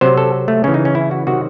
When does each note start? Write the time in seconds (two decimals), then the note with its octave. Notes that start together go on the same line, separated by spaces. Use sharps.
0.01 C3 F#3 C5
0.18 A4
0.48 A3
0.64 C#3 E3 C#4
0.74 D#4
0.85 C#4
0.95 E4
1.11 F#4
1.27 C3 D#3 F#3 F#4